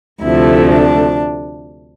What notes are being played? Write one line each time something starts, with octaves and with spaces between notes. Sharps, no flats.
D2 C3 F3 A3 E4
D4